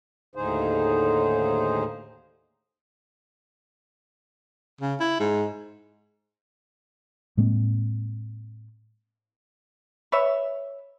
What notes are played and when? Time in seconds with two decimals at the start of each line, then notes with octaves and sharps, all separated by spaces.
0.35 D#2 A2 D3 D#4 G#4 C5
4.81 C#3
5.00 E4
5.19 G#2
7.37 A2 G#3 A#3 C4
10.12 B4 C#5 E5